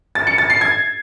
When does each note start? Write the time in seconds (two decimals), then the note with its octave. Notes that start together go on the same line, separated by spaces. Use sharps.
0.15 A6
0.27 C#7
0.38 A6
0.50 C7
0.61 G#6